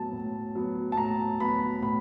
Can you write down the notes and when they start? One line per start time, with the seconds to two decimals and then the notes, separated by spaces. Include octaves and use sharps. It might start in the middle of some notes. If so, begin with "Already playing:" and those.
Already playing: A2 F#3 B3 A5
0.13 A2
0.55 F#3 B3
0.92 A5
0.97 A2 A#5
1.40 F#3 B3 B5
1.82 A2 B5